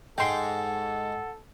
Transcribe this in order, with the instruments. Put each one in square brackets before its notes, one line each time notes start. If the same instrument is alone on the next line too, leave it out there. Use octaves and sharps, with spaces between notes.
[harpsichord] G#2 G#3 [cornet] A4 [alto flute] F#5 [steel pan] G5 C6